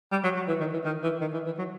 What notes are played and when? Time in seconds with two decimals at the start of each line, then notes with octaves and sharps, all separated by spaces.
0.11 G3
0.24 F#3
0.36 F#3
0.48 E3
0.60 D#3
0.73 E3
0.85 D#3
1.03 E3
1.21 D#3
1.34 E3
1.46 E3
1.58 F#3